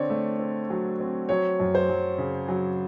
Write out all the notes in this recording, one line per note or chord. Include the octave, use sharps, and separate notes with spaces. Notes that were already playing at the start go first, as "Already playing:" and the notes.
Already playing: D3 C4 C#5 D5
A3
C4
F#3
C4
F#3 C#5
F#2
C5
F#3
C#3
F#3